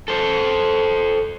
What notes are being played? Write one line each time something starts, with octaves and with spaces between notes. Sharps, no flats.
A4 C5